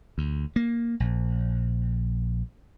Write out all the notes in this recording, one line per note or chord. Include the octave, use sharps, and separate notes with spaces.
D2
A#3
A#1